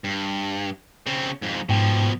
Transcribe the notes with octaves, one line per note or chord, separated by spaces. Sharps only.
G2
C#3 C4
F2 G#2
G#2 B2 F3 G5